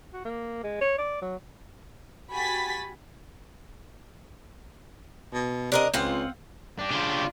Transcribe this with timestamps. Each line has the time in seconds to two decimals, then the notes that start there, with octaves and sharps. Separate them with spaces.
0.13 F#4
0.25 A#3
0.64 G#3
0.81 C#5
0.98 D5
1.22 F#3
2.31 F#4 G4 G#5 B5 A6 B6
5.33 B2
5.72 C3 D4 A#4 D#5
5.94 C#2 C4 F4 F#5
6.79 D4 G4
6.91 C#3 D4 F4 G4